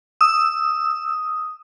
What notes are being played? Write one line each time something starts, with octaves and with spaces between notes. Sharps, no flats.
D#6 E6